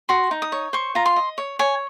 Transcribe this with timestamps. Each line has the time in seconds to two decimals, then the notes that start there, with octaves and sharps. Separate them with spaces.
0.09 F#4 C6
0.31 D#4
0.42 D#6
0.52 C#5
0.73 C5 C#6
0.95 F4 A#5
1.06 C6
1.16 D#5
1.38 C#5
1.59 C#5 G#5